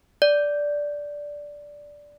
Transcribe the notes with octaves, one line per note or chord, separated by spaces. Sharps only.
D5